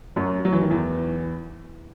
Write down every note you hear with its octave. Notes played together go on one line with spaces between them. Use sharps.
F#2 F#3
F#3
E3
D#3
E2 E3